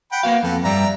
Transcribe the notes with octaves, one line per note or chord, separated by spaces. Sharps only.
F#5 G5 B5
A#3 B3 F#4 F5
F2 A4 B4
G2 G3 D5 E5 A#5